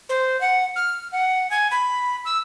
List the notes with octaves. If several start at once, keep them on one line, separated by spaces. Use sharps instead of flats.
C5
F#5
F6
F#5
G#5
B5
E6